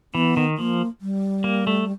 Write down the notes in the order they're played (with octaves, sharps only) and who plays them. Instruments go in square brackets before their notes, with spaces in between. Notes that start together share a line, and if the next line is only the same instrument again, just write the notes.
[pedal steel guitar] E3 [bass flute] B3
[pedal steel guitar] D#3
[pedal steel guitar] F3 [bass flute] A#3
[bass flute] G3
[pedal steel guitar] A#3
A3